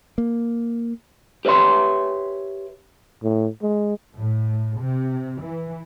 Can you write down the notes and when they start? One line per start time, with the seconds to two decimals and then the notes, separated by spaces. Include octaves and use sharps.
0.18 A#3
1.45 G4 B4 C#5 E5 C6
3.24 A2
3.62 G#3
4.17 A2
4.79 C3
5.42 E3